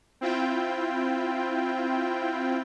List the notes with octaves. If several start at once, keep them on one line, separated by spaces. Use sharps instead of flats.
C4 E4 F4 G5